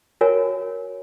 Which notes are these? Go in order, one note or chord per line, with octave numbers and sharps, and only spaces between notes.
F#4 A#4 C#5 G#5